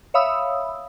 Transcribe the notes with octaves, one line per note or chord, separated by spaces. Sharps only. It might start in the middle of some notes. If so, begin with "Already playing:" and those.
C#5 E5 F5 B5 D#6 E6